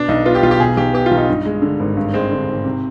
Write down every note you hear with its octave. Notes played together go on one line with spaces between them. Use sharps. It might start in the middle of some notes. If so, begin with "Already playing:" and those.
Already playing: B2 D4
B1 D#4
B3 F4
G4
B1 F4
G4
B2 G#4
B1 G4
B3 G4
F4
B1
D#4
G2
G#3
D3
G#1
G2
G#3 C4
D3
G#1
C3